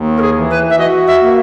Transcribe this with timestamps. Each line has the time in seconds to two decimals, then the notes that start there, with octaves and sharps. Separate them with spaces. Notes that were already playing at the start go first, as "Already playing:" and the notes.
Already playing: D#2
0.17 A#4
0.22 G#4
0.36 E3
0.50 B4
0.70 E5
0.78 F#4 D#5
1.07 E5
1.21 A#3